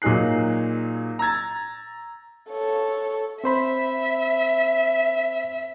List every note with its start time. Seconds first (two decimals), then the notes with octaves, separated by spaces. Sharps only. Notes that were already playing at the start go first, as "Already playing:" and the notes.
0.02 A#2 F#3 D#4 G#4 F#6 C7
1.19 A#5 E6 G#6 A6
2.50 A4 C#5
3.44 C4 C5 E5 B5